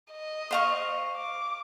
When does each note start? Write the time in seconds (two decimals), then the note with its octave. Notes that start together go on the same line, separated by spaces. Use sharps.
0.12 D#5
0.51 C5 F5 C#6
1.16 D6